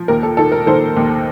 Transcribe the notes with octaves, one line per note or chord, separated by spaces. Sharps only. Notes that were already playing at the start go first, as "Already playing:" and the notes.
Already playing: F3
D#2 A#4
A4
D#3 A4
A#4
D#3 A4 C5
D#2